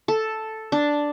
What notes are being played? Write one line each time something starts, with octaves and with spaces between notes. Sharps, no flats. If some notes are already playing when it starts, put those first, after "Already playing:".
A4
D4